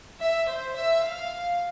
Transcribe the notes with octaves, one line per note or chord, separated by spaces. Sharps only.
E5
C5
E5
F5